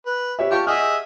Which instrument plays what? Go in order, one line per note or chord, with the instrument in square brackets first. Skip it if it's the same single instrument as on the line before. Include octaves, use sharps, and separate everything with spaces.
[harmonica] B4
[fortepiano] G4 C#5 E5
[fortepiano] F4 A5 C#6 [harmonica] G4
[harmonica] G#4 D#5 E5 [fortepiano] F#5 F6